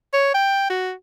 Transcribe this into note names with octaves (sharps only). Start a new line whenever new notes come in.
C#5
G5
F#4